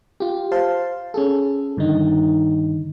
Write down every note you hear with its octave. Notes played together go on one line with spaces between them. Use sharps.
F4 G4
C5 F5 A5 C6
C#4 G#4 A4
G2 D3 D#3 D#4